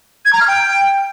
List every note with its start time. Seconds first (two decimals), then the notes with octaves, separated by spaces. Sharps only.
0.25 G#6
0.32 A#5
0.40 F6
0.47 G5